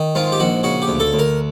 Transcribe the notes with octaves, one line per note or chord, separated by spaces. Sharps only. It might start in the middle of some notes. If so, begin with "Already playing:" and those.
Already playing: D#3
G#2 F4
G4
A#1 F#4
C#3 F#4
G4
D2
A4
D2
A#4